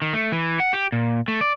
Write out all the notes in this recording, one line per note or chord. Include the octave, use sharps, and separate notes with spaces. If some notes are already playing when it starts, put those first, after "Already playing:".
D#3
A3
E3
F#5
G4
A#2
A3
D5